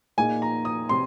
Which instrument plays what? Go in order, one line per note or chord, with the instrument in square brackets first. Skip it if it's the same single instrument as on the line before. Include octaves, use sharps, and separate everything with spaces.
[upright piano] A#2 A#3 D#4 G#4 [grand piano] G#5
[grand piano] A#5
D#6
[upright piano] C3 [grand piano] C6